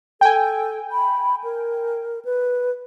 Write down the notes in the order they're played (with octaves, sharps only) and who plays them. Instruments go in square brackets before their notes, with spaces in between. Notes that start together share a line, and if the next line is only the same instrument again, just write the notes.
[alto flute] A4 [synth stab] G5 G#5
[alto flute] B5
A#4
B4